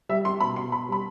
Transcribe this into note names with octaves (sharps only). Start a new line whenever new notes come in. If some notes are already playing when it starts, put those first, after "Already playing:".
G3 E5
G3 C6
B2 B5
B2 C6
B2 B5
G3 B5